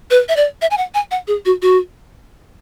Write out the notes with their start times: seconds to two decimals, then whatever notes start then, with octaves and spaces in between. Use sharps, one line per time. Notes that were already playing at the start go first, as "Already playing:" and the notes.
0.10 B4
0.28 E5
0.36 D5
0.62 E5
0.71 G#5
0.78 F#5
0.94 G#5
1.11 F#5
1.28 G#4
1.45 F#4
1.62 F#4